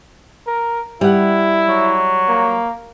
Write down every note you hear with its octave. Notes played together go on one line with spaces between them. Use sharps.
A#4
G3 E4 F#5
F#3
A#3